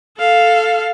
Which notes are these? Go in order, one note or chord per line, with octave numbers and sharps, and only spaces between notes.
A4 F5